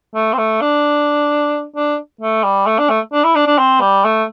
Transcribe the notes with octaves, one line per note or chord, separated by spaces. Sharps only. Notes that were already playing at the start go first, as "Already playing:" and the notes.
A3
C4
A3
D4
D4
A3
G3
A3
D4
A3
D4
E4
D4
D4
C4
G3
A3